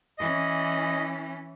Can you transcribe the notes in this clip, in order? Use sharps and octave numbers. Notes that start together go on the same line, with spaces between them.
E3 C#4 D#5